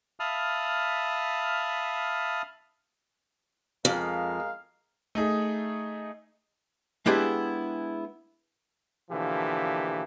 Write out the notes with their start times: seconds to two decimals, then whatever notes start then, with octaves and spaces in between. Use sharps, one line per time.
0.20 E5 F5 A5 B5 D#6 F6
3.85 F2 G#3 A#4 F5
5.15 A3 D#4 G#4
7.06 G#3 B3 D4 E4 G4 G#4
9.11 B2 D3 E3 F3 A#3 G4